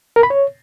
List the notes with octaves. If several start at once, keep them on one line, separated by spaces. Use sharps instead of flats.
A#4
B5
C#5